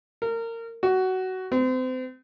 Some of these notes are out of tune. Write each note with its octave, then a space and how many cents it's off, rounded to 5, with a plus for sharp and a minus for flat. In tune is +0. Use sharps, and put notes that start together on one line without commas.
A#4 -25
F#4 +15
C4 -35